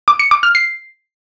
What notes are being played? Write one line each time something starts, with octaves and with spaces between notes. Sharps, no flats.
D6
C#7
D6
F6
C7